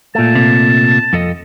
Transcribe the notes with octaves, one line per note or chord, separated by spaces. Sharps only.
A#2 A3 A5
C3
F2 A4 D#5